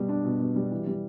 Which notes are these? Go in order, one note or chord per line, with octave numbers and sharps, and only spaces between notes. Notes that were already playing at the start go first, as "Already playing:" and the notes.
Already playing: B2 G3
D4
B2
B2
G3
E3
G3